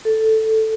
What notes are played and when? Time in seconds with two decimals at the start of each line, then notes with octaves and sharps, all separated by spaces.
0.05 A4